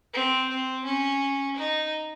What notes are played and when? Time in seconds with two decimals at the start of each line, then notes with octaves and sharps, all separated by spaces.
0.14 C4
0.49 C4
0.85 C#4
1.56 D#4